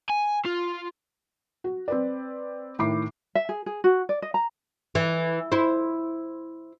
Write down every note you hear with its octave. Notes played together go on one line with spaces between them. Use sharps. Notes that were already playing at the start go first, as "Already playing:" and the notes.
G#5
F4
F#4
C4 B4 D5
A2 D#3 B5 D6 C7
E5
G#4
G#4
F#4
D5
D#5
A#5
E3
E4 C5